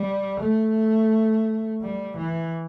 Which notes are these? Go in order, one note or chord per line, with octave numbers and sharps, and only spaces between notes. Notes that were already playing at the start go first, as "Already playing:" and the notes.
Already playing: G3
A3
G3
E3